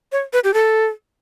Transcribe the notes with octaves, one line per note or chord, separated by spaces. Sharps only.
C#5
B4
G4
A4